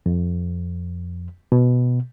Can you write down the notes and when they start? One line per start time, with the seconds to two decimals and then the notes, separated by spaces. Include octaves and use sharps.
0.06 F2
1.52 B2